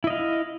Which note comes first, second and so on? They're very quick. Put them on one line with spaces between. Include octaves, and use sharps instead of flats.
E4 D#5 F5